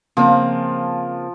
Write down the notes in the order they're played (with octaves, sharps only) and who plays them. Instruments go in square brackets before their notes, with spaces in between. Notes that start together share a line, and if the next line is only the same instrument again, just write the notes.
[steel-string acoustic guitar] C#3 A#3 C4 [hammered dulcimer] F3